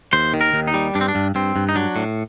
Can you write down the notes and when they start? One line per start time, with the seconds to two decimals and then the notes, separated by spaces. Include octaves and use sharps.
0.13 D#2 C5
0.34 D#3
0.41 A#4
0.54 D#2
0.67 D#4
0.74 G3
0.95 G2 D4
1.01 C4
1.08 D4
1.15 G2
1.35 G2 C4
1.56 G2
1.69 D#4
1.75 F#3 D4
1.96 A2